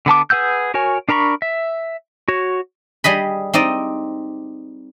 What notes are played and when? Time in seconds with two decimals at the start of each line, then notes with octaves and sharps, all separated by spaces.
0.06 D3 B3 A5 D6
0.30 G#4 B4 F#5 E6 G6
0.74 F#4 A#4 C#5 G#5
1.09 D4 A#4 A#5 B5 C#6
1.42 E5
2.28 F#4 C#5
3.04 G3 G#4 D#5 B5
3.54 C4 D#4 D5 D#5